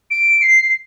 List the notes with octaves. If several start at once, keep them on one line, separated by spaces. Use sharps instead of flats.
D7
C7